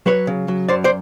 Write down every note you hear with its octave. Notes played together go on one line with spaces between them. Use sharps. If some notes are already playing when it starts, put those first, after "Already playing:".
F#3 B4 C#5
C#3
F#3
F#2 C5 D5
C5 D5